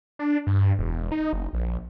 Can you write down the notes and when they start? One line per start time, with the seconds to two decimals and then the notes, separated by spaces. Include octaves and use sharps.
0.19 D4
0.47 G2
0.79 E1
1.12 D#4
1.33 F#1
1.53 A#1